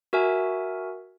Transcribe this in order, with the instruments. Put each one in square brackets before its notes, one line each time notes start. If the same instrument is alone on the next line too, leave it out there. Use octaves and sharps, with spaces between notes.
[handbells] F#4 A#4 E5 G#5